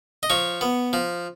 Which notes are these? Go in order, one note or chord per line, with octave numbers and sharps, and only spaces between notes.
D#5
F3 C#5
B3
F3